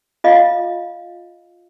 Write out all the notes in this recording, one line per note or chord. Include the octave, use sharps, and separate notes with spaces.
F4 D#5 F5